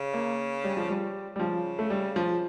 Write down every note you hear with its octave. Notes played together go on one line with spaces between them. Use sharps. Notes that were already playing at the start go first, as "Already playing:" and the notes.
Already playing: C#3
A#3
G3
F3
G3
G3
C#3 F3
A3
G3
F3